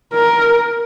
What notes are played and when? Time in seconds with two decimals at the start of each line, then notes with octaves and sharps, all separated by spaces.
0.14 A#4